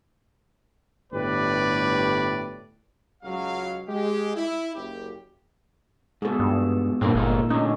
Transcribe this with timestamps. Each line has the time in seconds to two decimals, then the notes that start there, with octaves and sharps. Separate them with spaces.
1.13 G1 A2 G4 B4 D5
3.24 C#2 F#3 F5
3.88 G#3 G4
4.36 E4
4.75 F#1 G4
6.22 G#2 B2 G#4 A4
6.40 G2
7.01 G2 A#2 D3 A#3 C4 A4
7.15 G1 G#3 A#3 D#4
7.50 A2 D3 C#4 D#4